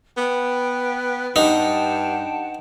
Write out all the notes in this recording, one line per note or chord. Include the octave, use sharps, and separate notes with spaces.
B3 G5
G2 D#4 F#5 G5 A5